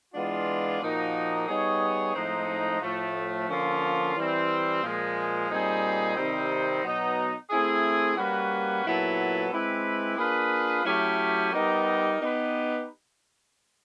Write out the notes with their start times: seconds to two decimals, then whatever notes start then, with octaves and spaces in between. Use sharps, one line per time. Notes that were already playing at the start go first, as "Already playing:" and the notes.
0.14 E3 G#3 B3 D4 F4
0.81 A#2 F3 A#3 D#4 F#4
1.48 G3 B3 D#4 G#4 C#5
2.15 A2 F3 G#3 C4 D#4
2.82 A2 F3 A3
3.49 D3 F3 A#3 C#4 F4
4.15 E3 G3 C4
4.83 A#2 F3 G#3
5.50 A#2 G3 C4 D#4 G#4
6.17 C3 D#3 G3 C4 D#4
6.83 B2 F#3 B3 D#4
7.50 A3 C4 E4 G#4
8.17 G3 A#3 C#4 F#4 B4
8.85 A#2 F#3 B3 E4 A4
9.51 G#3 C4 E4 G4 B4
10.18 A#3 D4 F4 G#4 B4
10.85 F#3 A3 C#4 E4 G4
11.52 G3 B3 D#4 G4 A#4
12.19 B3 D#4 G4 B4